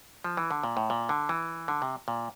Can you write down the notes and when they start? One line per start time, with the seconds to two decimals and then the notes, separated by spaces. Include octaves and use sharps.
0.24 F3
0.37 E3
0.50 D3
0.64 A#2
0.77 A2
0.90 A#2
1.09 D3
1.29 E3
1.68 D3
1.82 C3
2.08 A#2